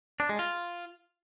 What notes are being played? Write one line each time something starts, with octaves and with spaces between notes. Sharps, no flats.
D4
G#3
F4